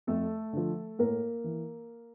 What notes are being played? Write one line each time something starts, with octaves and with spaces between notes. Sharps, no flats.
F2 A3 A4
D3 F3
A2 A#3 A#4
E3